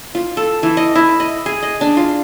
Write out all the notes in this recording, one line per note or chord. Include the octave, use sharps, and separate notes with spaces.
F4
A4
E3
D#5
E4
D#5
G#4
D#5
D4
F4